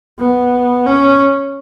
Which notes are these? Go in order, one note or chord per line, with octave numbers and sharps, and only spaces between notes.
B3
C#4